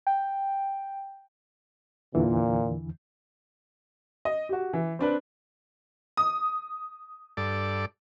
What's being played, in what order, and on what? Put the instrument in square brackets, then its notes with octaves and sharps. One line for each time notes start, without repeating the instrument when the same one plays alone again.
[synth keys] G5
[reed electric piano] E2 D3 E3 [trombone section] A#2
[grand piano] D#5
F#4 G4
E3
C4 D4 B4 D5
[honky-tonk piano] D#6
[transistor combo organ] G2 A4 D5